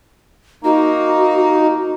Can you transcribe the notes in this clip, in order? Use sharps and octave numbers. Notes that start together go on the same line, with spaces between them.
A#3 D#4 F#4